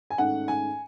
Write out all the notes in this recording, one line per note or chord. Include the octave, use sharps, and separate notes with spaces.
G#5
G#2 D#3 A3 C#4 F#5
G#5